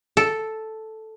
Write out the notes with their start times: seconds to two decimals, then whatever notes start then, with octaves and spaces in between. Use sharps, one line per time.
0.17 A4